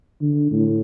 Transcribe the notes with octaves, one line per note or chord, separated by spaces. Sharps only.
D3
A2